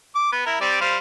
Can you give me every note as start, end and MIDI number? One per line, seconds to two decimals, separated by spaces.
0.15 0.30 86
0.32 0.42 59
0.46 0.60 64
0.46 0.60 70
0.61 0.78 55
0.61 0.78 60
0.61 0.78 74
0.81 0.97 55
0.81 0.97 72
0.81 0.97 77